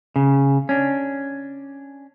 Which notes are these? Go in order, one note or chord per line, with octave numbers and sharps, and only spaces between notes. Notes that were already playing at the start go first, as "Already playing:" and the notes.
C#3
C#4 D4